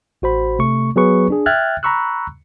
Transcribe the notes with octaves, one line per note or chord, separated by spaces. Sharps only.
A1 F#4 C5 B5
C3 A3 C#6
F#3 B3 G#4 B4 C#6
D4 G#4
E5 G5 F6 F#6 G#6 A6
A#5 B5 C#6 E6 F#6